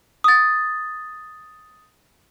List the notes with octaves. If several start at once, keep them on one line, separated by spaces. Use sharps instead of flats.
D#6 A6